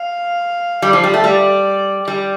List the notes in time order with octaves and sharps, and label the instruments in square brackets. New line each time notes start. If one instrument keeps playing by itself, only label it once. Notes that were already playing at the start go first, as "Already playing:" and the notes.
Already playing: [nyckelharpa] F5
[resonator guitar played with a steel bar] G3
F3
G3
A3
[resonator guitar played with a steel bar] G3 [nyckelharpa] D5
[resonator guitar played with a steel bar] G3